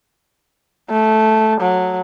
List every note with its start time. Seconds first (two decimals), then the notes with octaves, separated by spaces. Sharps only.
0.90 A3
1.60 F#3